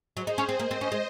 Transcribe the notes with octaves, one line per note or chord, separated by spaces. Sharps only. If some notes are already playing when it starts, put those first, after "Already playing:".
F#3 G#4 C5
D#4
C#4
C4
A#3 C5 D#5
C4
C#4
G#3